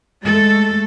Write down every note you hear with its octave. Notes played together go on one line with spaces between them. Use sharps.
G#3 A3 A4